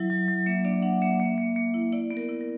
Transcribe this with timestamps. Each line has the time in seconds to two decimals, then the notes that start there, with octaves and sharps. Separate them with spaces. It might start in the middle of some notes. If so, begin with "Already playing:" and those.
Already playing: F#3 E4 E5
0.10 F#3
0.28 F#3
0.46 A#3 E5
0.65 D4 D5
0.82 D4 F#5
1.02 A#3 E5
1.19 A#3 E5
1.38 A#3
1.56 A#3
1.74 E4
1.92 E4 D5
2.10 B3
2.17 A#4
2.29 E4
2.41 A#4